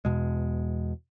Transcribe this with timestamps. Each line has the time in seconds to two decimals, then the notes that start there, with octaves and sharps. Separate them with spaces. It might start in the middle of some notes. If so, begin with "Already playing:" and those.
0.05 E2 B2 G#3